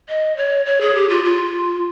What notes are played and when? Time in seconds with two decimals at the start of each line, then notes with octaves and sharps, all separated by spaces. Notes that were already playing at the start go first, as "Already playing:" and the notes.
0.09 D#5
0.37 C#5
0.66 C#5
0.81 G#4
0.95 G4
1.09 F4
1.24 F4